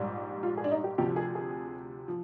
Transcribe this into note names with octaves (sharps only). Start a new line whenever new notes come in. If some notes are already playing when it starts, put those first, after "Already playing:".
Already playing: A#1 G#2 G3
F4
G#4
D4
D#4
G4
D2 C3 F3 G4
G#4
G#4
F3